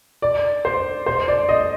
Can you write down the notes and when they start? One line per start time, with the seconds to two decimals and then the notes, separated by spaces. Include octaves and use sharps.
0.22 D5
0.65 C5
1.06 C5
1.28 D5
1.49 D#5